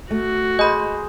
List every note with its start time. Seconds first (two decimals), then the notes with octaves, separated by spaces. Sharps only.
0.11 A3 F#4
0.59 G#3 G#4 C5 D#5 B5